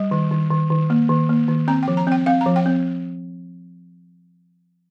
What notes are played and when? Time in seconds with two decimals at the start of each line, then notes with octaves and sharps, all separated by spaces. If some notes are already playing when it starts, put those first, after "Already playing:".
Already playing: G3
0.11 D#3
0.32 D#3
0.51 D#3
0.70 D#3
0.90 A#3
1.09 D#3
1.29 A#3
1.48 D#3
1.68 C4 A#5
1.83 G5
1.88 F3
1.97 A#5
2.07 C4 G5
2.26 C4 F5
2.41 A#5
2.46 F3
2.56 G5
2.66 C4